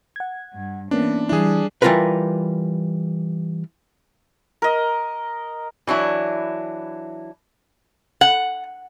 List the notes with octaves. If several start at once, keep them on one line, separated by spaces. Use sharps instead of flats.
F#5 G#6
G2
E3 A#3 B3 C#4 D4
E3 G3 D4 E4 G#4
E3 G3 D#4 F4 A#4 B4
A#4 D#5
E3 F#3 D4 E4
F#5